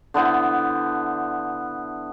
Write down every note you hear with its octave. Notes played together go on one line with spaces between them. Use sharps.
D3 B3 E4 C5